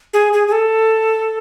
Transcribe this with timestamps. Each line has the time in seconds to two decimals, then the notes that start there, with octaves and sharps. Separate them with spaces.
0.13 G#4
0.33 G#4
0.47 G#4
0.52 A4